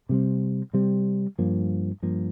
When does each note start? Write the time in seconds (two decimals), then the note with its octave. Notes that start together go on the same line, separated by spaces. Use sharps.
0.09 C3 G3 C4
0.73 C3 G3 C4
1.39 G2 F3 A#3
2.02 G2 F3 A#3